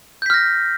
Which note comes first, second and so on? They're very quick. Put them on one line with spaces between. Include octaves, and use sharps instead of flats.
G6 B6 F6 A#6